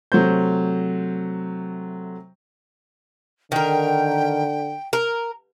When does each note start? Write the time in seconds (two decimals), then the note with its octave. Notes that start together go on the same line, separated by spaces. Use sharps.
0.12 C3 F#3 A3 C5 G6
3.52 D3 D#3 A#4 G5
4.93 A#4